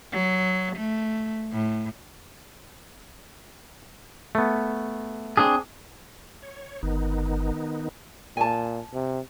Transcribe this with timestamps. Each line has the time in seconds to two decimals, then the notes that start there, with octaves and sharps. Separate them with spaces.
0.12 F#3
0.76 A3
1.52 A2
4.35 A3 B3
5.37 C4 D4 G#4
6.42 C#5
6.83 G1 D#3 B3 D#4
8.37 A#2 G#5 A5
8.94 C3